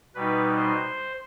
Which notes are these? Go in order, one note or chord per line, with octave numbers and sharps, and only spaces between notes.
B2 G3 D#4 B4
C5